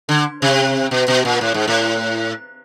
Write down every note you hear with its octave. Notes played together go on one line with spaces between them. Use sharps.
D3
C3
B2
B2
A#2
A2
G#2
A2